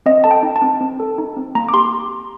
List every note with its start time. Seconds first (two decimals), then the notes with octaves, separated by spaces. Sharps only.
0.06 C4 D#5
0.24 A4 A5
0.31 G5
0.43 D#4
0.56 A5
0.62 C4
0.81 C4
1.00 A4
1.18 D#4
1.37 C4
1.55 A#3 A#5
1.69 D6
1.73 G4 C6